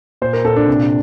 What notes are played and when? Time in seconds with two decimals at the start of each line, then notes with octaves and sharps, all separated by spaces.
0.22 A#2 C5
0.33 A#4
0.45 A#2 A4
0.56 D4
0.68 C3